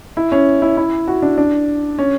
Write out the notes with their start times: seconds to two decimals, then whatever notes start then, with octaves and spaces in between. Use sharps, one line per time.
0.17 E4
0.32 C#4
0.62 E4
0.77 E4
1.08 F#4
1.22 D4
1.38 D4
1.99 C#4